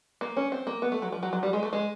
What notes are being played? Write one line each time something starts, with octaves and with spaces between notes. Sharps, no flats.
A#3
C#4
C4
A#3
B3
A3
F#3
F3
F#3
F#3
G3
G#3
A3
G#3